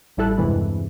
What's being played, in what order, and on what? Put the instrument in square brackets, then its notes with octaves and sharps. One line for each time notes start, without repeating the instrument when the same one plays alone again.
[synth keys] A1 G3 E4 A4 F#6
E2 G2 C3 E3 G#3 E4